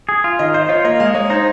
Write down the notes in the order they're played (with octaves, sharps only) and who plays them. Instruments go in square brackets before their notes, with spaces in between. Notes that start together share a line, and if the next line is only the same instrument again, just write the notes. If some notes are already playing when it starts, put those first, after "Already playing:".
[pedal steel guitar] G#4
F4
[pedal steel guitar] D#3 [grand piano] D#5
[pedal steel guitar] C5 [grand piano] D#5
[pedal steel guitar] F4 [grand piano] C#5
[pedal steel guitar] A#3 [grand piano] D#5
[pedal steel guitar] G#3 [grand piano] F5
[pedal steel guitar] G#3 [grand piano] C#5
[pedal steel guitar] D#4 [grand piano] C5